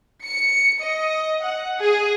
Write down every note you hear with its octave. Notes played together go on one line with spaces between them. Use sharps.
C#7
D#5
F#5
G#4